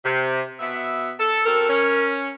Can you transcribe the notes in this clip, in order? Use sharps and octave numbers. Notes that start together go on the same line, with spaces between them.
C3
B2 B3 E5
A4
C4 F#4 A4 A#4
C#4